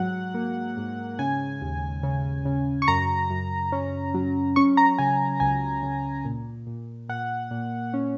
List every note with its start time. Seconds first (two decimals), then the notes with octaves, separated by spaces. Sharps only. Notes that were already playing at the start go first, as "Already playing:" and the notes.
Already playing: G#2 F#3 F#5
0.34 A#3
0.77 G#2
1.19 C#3 G#5
1.62 D#2
2.03 C#3
2.45 C#3
2.82 C#6
2.88 F#2 A#5
3.30 F#2
3.72 C#4
4.14 F#3
4.56 C#4 C#6
4.77 A#5
4.98 C#3 G#5
5.40 C#2 G#5
5.83 C#3
6.25 A#2
6.67 A#2
7.09 A#2 F#5
7.51 A#2
7.94 C#4